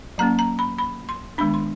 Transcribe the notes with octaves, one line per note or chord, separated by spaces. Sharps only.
F#3 A#3 C#4 A#5
A#5
B5
B5
C6
D#3 G#3 B3 D4 B5
C6